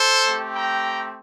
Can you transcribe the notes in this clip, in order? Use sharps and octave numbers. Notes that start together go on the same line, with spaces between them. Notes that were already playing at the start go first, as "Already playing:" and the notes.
Already playing: A4 C5
A3 C4 G4
G5 A#5